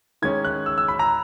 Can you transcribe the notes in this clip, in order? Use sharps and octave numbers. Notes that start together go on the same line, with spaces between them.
D#3 G#3 C#4 G#6
F#6
E6
E6
B5
A#5